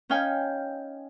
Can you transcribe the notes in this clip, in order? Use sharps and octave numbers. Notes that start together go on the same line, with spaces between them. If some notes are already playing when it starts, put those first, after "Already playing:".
C#4 D#4 F5 G5 G#5